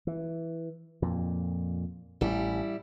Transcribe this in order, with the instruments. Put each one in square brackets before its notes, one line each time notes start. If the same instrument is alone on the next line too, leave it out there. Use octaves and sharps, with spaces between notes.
[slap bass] E3
F2 A#2
[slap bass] A1 A2 [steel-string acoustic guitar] G3 E4